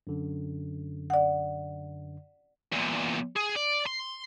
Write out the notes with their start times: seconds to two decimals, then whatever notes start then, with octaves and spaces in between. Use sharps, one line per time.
0.07 F#2 D3
1.10 D5 F#5
2.72 E2 A#2
3.36 G#4
3.56 D5
3.86 C6